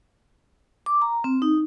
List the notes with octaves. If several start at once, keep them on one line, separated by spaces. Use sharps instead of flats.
D6
A#5
C4
D#4